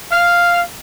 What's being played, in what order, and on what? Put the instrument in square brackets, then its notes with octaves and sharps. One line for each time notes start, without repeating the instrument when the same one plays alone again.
[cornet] F5 [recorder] F6